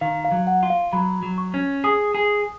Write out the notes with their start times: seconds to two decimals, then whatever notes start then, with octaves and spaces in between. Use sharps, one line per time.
0.01 D#3 F5
0.25 F5
0.32 F#3
0.47 F#5
0.63 F4
0.70 F5
0.93 F#3 B5
1.23 F#3
1.38 C#6
1.54 C#4
1.84 G#4 D#6
2.15 G#4